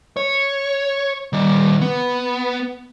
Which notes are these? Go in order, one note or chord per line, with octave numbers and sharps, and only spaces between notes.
C#5
D#3 G3
B3